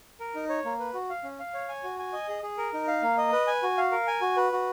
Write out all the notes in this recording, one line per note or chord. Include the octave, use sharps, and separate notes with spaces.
A#4
D#4
C#5
A#3
B4
F#4
F5
C#4
F5
C#5
G#5
F#4
G#5
D#5
G#4
G#4
A#4
D#4
F5
A#3
D#5
B4
G#5
F#4
F5
A#4
G#5
F#4
B4
F#4